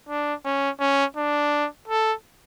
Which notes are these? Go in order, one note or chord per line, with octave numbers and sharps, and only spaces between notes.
D4
C#4
C#4
D4
A4